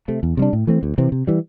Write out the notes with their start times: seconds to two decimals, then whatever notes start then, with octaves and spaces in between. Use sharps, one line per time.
0.08 C3 A3
0.23 E2
0.37 C3 G3 D4
0.53 A2
0.67 E3 A3 C4
0.83 D2
0.98 C3 E3 C4
1.12 C3
1.27 E3 G3